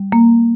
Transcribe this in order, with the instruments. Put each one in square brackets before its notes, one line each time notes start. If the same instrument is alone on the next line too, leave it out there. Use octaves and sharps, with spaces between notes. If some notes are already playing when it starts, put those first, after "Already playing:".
Already playing: [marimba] G3
A#3